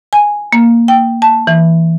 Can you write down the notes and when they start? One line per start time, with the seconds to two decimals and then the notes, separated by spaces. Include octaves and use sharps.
0.13 G#5
0.52 A#3
0.88 G5
1.22 A5
1.47 E3